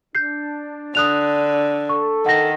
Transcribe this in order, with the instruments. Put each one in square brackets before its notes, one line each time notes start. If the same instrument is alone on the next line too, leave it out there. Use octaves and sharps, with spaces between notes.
[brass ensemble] D4 [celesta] G6 C7
[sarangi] D3 [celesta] D#6 F#6 F7
[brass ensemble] A4 [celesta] C#6
[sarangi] D#3 [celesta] F#5 A#6